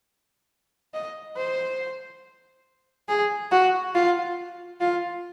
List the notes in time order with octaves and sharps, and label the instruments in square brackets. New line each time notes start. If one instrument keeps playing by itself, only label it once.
[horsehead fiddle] D#5
C5
G#4
F#4
F4
F4